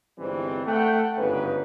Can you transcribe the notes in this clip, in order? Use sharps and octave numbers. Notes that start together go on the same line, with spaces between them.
G1 E3 G3 G#3 C4
A3 F#5 G5
G1 G#2 C#3 B4